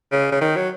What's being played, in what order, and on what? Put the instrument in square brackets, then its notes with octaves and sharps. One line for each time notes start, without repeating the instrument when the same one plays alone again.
[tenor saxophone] C#3
C#3
D#3
F#3